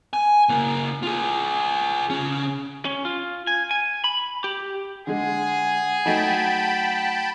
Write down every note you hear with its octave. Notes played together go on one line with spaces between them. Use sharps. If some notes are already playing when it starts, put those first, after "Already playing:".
G#5
C#3 A#3
F4 G#4
C#3 C#4
C#4
F4
G#5
G#5
B5
G4
D3 G#3 G#4 F#5
F#3 A3 D#4 G5 A5 B5